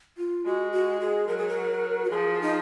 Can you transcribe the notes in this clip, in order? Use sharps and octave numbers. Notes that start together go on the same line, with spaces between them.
F4
G#3 F#4
F#4
G#4
F#3 A#4
G#4
A#4
F#4
F3 G#4
D#4